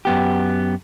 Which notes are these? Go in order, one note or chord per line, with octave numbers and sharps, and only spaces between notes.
F#2 B3 G4